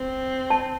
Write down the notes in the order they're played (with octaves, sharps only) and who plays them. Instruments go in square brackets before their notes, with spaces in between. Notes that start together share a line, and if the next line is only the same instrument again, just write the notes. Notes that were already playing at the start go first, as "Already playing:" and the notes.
Already playing: [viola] C4
[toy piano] A5